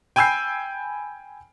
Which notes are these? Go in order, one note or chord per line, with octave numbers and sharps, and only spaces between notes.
G5 G#5 B5 E6 G6 C7